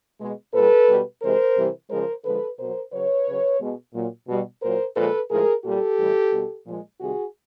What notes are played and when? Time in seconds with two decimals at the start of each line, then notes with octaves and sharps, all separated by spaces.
0.20 B2 G#3
0.54 A#2 G3 A4 B4
0.88 B2 G3
1.22 C3 E3 G#3 A#4 C5
1.56 C3 E3 G3
1.90 C#3 F3 G#3 A#4 C5
2.24 D3 F3 G#3 A4 B4
2.58 B2 F#3 A#4 C5
2.92 C#3 F#3 B4 C#5
3.26 C#3 F#3
3.60 B2 G#3
3.94 A#2 F#3
4.28 B2 G3
4.62 A#2 F#3 A#4 C5
4.96 A#2 F3 G#3 A4 B4
5.30 A2 F3 G#3 G#4 A#4
5.64 A#2 G3 G4 A4
5.98 A2 E3 G3
6.32 B2 G3
6.66 A#2 F3 G#3
7.00 C3 D#3 G3 F#4 G#4